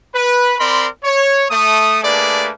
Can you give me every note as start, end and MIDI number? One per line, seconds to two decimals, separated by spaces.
0.14 0.53 71
0.58 0.86 60
0.58 0.86 70
0.58 0.86 74
0.58 0.86 83
0.58 0.86 84
1.04 1.44 73
1.49 2.02 57
1.49 2.02 87
2.02 2.49 57
2.02 2.49 58
2.02 2.49 62
2.02 2.49 68
2.02 2.49 71
2.02 2.49 74